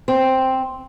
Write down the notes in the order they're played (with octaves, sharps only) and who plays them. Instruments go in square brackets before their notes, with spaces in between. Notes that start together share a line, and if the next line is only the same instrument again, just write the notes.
[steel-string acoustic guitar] C4